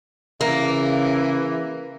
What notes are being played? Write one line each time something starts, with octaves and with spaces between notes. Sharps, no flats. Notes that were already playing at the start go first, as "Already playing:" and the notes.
C#3 E3 A#3